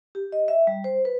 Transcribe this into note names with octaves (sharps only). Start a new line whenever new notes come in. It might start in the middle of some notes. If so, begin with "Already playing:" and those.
G4
D#5
E5
G3
C5
B4